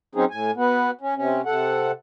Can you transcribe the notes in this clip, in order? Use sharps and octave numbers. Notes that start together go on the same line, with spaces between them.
F#3 C4 C#4 D#4 G#4
A2 G#5
B3 F#4
C#4
C3 C#4
C3 A4 F#5